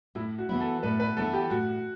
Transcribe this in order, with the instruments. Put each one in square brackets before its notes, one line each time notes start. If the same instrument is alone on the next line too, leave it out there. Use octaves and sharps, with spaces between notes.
[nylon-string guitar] A2 [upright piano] E4
[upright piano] F#4
[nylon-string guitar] E3 B3 E4
[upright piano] A4
[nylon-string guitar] A2 [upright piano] B4
[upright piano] B4
[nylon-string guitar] E3 B3 E4 [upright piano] A4
[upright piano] G4
[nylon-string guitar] A2 [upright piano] F#4